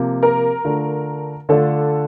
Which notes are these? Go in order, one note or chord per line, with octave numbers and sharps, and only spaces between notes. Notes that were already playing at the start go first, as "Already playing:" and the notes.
Already playing: C3 F3 A#3
A#4
D3 A3 D4 F4
D3 A3 D4 F4 A4